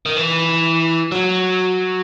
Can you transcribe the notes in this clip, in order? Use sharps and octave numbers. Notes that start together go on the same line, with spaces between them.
D#3
E3
F#3